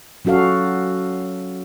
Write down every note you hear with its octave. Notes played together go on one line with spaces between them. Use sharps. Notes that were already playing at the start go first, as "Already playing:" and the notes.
F#3 C#4 F#4 A4 F5